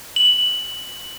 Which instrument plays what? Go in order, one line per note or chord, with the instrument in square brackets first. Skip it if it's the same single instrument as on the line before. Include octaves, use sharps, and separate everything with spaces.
[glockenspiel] F#7